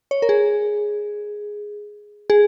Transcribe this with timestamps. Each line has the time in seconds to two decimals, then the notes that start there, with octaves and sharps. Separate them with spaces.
0.11 C#5
0.22 A#4
0.29 G#4
2.30 G#4